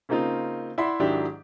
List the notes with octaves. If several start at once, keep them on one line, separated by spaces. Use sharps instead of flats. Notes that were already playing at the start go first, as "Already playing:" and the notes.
C#3 A#3 C4 D#4 F4
E4 D5 E5 F#5 B5 C6
G#2 D#3 F#3 D4 E4 G4